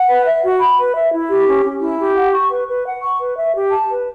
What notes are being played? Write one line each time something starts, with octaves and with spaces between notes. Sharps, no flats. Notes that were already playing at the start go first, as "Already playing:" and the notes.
Already playing: F#5
B4
E5
F#4
B5
B4
E5
E4
G4
C#4
C#4
E4
G4
F#5
C#6
B4
B4
F#5
C#6
B4
E5
G4
A5
B4